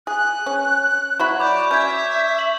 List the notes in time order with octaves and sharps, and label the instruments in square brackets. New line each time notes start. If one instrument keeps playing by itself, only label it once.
[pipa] G#4 [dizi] F#6
[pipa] C#4
[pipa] F#3 E4 B5 [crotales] C#6
[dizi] D5 [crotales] D6 G6
[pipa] C#4 [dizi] E5 [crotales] G6 G#6
[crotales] C#6 F#7